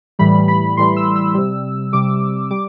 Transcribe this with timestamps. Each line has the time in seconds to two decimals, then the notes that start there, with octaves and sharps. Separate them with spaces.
0.19 A2 E3 G3 B5
0.48 B5
0.77 A2 E3 G3 C6
0.96 E6
1.16 E6
1.34 C3 G3
1.93 C3 G3 D6
2.51 G3 D6